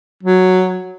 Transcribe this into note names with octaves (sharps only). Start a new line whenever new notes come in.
F#3